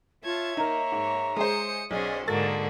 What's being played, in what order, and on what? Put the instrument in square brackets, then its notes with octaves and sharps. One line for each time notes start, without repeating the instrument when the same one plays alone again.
[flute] F4 [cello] C#5 E5 [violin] A5 G#6
[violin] A#3 [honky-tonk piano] D#4 A#4 [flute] A#5
[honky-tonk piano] G#2
[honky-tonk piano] G#3 G#4 C5 [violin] D#6 C#7
[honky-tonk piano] B1 [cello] C#4 F#5 [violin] G#4 C5 [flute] D5
[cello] G#2 D3 [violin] A#3 F#4 [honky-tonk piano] A4 A6 [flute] A#4